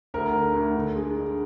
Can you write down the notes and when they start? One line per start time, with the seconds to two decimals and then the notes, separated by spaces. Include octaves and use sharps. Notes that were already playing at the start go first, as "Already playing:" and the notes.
0.14 D2 A#4
0.34 D3
0.55 D2
0.75 D3
0.96 G#3
1.16 D3